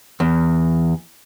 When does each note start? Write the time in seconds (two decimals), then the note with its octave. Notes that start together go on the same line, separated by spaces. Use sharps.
0.20 E2